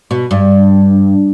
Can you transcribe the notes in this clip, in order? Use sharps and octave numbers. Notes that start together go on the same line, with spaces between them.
B2
G2